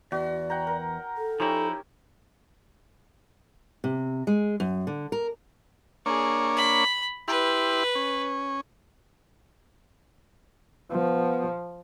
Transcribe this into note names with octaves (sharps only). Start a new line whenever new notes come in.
E2 F#4 D5
F#5 G5 A#5
A#4
A4
F3 C#4 D#4 E4 G4
C3
G#3
F#2
D3
A#4
A#3 D4 G#4 C#5
B5
E4 G4 B4 C6
C#4
F3 B3